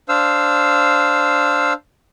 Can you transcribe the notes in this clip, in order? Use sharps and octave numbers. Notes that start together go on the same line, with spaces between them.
D4 C5 F5 E6